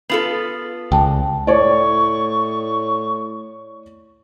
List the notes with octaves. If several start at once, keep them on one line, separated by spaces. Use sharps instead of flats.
B3 F4 A4 C7 F#7
C#2 G5 A5
A2 C#5 D5 C#6